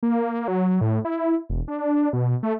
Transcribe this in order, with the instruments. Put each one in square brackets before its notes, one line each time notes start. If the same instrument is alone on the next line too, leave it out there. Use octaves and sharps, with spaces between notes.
[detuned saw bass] A#3
F#3
A2
E4
E1
D4
B2
A3